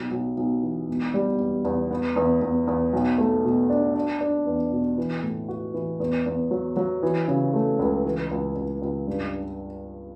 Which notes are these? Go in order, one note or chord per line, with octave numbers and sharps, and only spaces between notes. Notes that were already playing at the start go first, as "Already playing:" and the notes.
Already playing: B1
B1
B1
E3
E1
G3
E2
E2
B3
E2
E2
E2
B1
A3
B2
D4
D4
D4
E2
B2
E3
A2
F#4
E3
E2
E2
F#3
F#3
E3
C#3
A3
C#2
E3
C#2
C#2
C#2
G2
D4